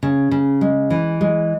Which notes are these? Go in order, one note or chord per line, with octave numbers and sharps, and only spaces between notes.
C#3
C#3
G#3
E3
G#3